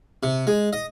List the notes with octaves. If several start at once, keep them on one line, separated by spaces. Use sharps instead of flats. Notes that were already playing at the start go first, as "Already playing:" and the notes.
C3
G#3
D#5